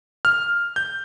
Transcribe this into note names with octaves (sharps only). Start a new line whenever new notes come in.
F6
G6